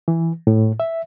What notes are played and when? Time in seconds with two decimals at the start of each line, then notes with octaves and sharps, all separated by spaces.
0.08 E3
0.47 A2
0.80 E5